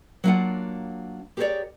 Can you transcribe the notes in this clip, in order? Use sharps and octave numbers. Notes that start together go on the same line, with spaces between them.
F#3 G3 A#3 D4 F4 F#5
G4 G#4 A#4 B4 C#5 D5